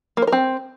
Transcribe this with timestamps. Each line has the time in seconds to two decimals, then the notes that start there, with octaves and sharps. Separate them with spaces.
0.17 A#3
0.22 C5
0.27 A#4
0.32 C4